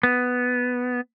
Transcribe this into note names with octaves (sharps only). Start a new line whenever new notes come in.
B3